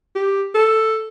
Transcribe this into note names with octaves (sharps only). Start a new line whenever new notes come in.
G4
A4